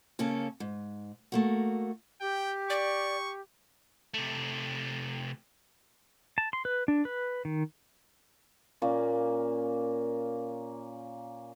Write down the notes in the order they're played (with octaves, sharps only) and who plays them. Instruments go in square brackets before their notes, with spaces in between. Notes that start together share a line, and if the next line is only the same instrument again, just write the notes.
[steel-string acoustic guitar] C#3 A#3 C#4 A4
G#2
A3 A#3 F#4
[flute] G4 [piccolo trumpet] G5
[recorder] D5 [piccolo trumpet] C#6
[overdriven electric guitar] C3 A3
[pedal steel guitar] A5
C6
B4
D4
B4
D#3
[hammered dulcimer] A#2 A#3 C#4